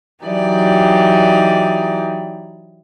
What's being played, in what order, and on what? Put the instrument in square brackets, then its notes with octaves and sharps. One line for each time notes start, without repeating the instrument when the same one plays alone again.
[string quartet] E3 F#3 D#4 G4 D5